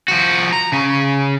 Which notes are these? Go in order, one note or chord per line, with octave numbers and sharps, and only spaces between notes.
F3 F#4
A#5
C#3 C#4